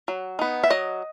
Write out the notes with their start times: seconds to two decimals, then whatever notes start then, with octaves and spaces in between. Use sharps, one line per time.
0.08 F#3
0.39 B3 D#4
0.64 E5
0.70 F#3 D#5